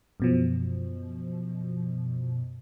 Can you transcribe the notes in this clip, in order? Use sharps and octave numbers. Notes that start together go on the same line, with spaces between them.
F#2 B2 F3